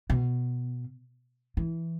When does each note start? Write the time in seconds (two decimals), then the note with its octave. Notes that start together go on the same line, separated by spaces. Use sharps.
0.10 B2
1.57 E3